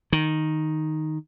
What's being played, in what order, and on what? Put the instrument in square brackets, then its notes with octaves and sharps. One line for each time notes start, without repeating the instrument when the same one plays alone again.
[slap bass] D#3